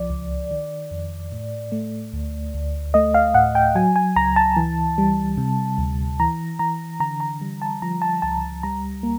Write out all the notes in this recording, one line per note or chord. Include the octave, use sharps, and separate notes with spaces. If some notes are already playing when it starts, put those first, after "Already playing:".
Already playing: C2 F3 D5
C#2
D#3
F2
A2
A3
D2
D2
A3 D#5
F5
A2 F#5
G5
F#3 G#5
G#5
C#2 A#5
A5
E3
G3
C3
D2
E3 A#5
E3 A#5
D3 A#5
A#5
G3
A5
F3 A#5
A5
C#2 A5
G3 A#5
A#3